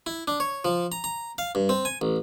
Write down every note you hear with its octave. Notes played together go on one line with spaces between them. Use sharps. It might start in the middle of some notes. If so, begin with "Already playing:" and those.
E4
D4
C#5
F3
A#5
A#5
F5
G2
C4
G#5
A1